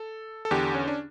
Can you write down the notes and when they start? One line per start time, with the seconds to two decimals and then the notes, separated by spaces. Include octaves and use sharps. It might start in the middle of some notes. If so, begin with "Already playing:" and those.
Already playing: A4
0.45 A4
0.51 E2 D3 G4
0.75 C#4
0.88 D4